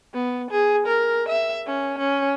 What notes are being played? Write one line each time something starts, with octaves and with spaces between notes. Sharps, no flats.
B3
G#4
A#4
E5
C#4
C#4